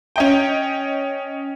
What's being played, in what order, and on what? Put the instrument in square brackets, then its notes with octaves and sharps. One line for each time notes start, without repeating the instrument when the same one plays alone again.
[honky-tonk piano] C#4 D#5 G5